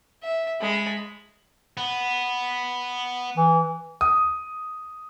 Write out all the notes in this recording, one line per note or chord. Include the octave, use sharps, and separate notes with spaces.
E5
G#3 B5
B3
E3
D#6